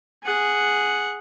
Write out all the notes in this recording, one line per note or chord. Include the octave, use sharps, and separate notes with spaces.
G#4 F#5